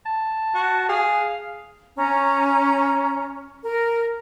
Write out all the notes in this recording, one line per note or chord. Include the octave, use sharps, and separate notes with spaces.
A5
F#4
G#4 F5
C#4 A#5
A#4